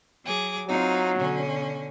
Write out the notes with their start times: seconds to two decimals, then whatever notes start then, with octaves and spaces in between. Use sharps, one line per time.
0.23 F#3 G#4 D6
0.67 F#3 C4 D#4 F4
1.17 B2 D3 C#4